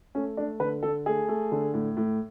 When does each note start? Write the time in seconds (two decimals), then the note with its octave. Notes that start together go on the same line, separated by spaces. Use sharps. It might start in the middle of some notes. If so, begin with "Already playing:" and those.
0.15 A3 C#4
0.37 A3 D4
0.60 D3 B4
0.83 D3 A4
1.06 A3 G#4
1.28 A3
1.52 D3
1.74 A2
1.97 A2